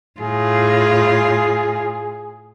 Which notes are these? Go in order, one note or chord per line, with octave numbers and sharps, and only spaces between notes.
A2 F4 G#4